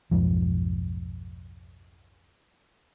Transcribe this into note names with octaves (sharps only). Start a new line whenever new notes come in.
B1 F2 G#2 F3